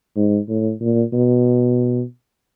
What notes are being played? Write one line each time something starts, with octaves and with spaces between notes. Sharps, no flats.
G#2
A2
A#2
B2